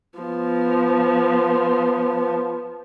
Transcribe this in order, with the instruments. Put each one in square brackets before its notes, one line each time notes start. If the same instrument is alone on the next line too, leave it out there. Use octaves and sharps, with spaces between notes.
[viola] F3 B3